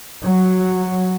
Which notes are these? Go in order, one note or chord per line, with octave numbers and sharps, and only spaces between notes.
F#3